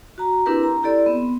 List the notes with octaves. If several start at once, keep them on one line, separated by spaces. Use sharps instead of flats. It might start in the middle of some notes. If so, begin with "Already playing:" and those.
F#4 A#5
C4 D4 E4 G4 A#4 B4
A#5
E4 G4 A4 D5 C6
B3 C4